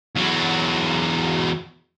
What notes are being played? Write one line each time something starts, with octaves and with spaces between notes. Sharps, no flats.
E2 F#3